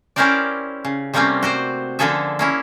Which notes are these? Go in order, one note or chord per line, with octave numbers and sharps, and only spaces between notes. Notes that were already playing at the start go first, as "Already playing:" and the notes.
C#4 E4 G4 A#4 C5 D5
C#3
C3 G3 A3 A#3 C4 C#4
F#4 G4 C5
D3 F3 A#3 G#4 A4 E5
A#3 C#4 E4